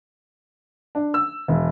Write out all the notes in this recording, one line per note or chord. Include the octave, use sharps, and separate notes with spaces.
D4
E6
E1